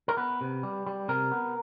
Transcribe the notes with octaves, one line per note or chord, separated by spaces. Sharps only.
A#4
B3 B4
C3
G3
G3
C3 A#4
B3